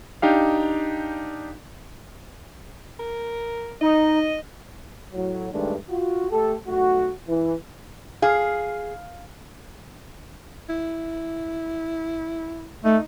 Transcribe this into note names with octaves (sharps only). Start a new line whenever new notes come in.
D4 D#4 G4 F5
A#4
D#4 D#5
A2 F#3
G2 D#3 G#3 A3 D4
F4 F#4
A3 G4 A4
B1 A3 F#4
E3
G#4 F5
E4
A3 D#4